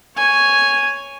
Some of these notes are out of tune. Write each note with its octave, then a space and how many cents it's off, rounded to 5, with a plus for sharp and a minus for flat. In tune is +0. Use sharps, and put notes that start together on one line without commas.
C#5 +0 G#5 +0